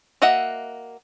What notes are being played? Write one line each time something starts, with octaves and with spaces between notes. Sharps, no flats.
A#3 F#4 D#5 E5 F#5